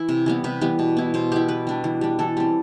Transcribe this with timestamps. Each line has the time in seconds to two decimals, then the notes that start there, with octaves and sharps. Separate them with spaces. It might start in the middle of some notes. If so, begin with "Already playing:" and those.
Already playing: E3 E4
0.09 C3
0.26 E3 G3 B3
0.44 C3 B4
0.61 E3 G3 B3
0.79 B2
0.97 B3 E4
1.14 B2 C5
1.32 B3 E4 G4
1.48 E3 B4
1.67 G3 D4
1.84 E3
2.01 G3 D4
2.19 E3 A4
2.37 G3 C4